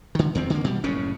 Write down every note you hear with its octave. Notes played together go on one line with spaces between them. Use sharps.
D3 D#3
E2 D#3 C4
D3 A#3
B2 G3
F#1 A2 C#3 C#4